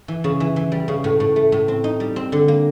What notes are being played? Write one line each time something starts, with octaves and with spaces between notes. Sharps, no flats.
E3
C#3
E3
E3
G3
C#3
A2
A2
A3
A2
C4
D#4
G3
C4
D3
A#3